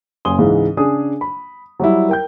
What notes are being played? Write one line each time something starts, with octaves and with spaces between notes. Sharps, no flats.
F#1 G#5 C6 D#6 G7
C#2 G#2 E3 G#3
C#3 D4 G#4 G#5 D#6
B5
F#3 G3 E4
A#4 G5 G6